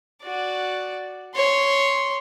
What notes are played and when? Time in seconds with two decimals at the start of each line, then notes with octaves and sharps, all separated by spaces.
0.24 F#4 D5
1.35 C#5 C6